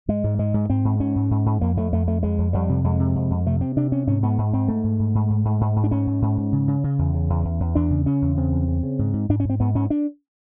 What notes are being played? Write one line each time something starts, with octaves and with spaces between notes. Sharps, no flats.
G#2 G#3
G#2
G#2 G#3
G#2
G#2 C4
G#2
G#2 C#4
G#2
G#2
G#2
F2 A#3
F2 A3
F2 A3
F2 A3
F2 G#3
F2
F2 G3
C3
F2 G#3
C3
F2
F2
C3 A3
C3 C4
C3 D4
C3 C#4
G#2 C#4
G#2 B3
G#2
G#2 C4
G#2 A3
G#2
G#2
G#2
G#2
G#2
G#2
G#2
D4
G#2 C#4
G#2
G#2
G#2
C#3
C#3
C#3
E2
C#3
E2
E2
E2
E2 D4
C#3
C#3 C#4
E2
C#3 C4
E2
C#3
C#3
G#2
G#2
G#2 D4
C#4
G#2 C4
G#2 B3
G#2 C#4
D4